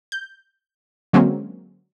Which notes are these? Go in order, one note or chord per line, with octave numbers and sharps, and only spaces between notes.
G6
D3 F#3 G#3 A#3 C4 C#4